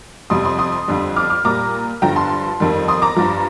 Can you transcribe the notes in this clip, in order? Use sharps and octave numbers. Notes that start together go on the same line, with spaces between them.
F2 C3 G3 C6 D#6
C6 D#6
C6 D#6
F2 D3 G3
D6 F6
D6 F6
A#2 G3 A#5 D6
G2 D3 F3 G5 A#5
A5 C6
F2 D#3 G3
C6 D#6
A#5 D6
G2 F3